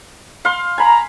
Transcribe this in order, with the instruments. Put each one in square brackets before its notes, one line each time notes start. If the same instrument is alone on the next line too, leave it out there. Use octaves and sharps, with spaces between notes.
[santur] F5 C6
[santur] G#5 B5 [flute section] A#5